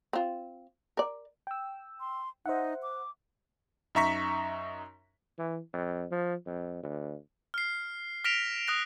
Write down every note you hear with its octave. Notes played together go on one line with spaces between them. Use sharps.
C4 F4
A#4 D5
G5 E6
C6
D#4 C5 E5 F#5
D6
F#2 D#4 E5 A#5 C#6 B6
E3
F2
F3
F2
D2
F6 C7
F6 A#6 B6 D7 E7 F7
D#6 F#6 A#6